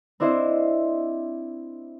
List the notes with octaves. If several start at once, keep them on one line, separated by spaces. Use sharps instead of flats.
C4 D4 E4 C5 D#5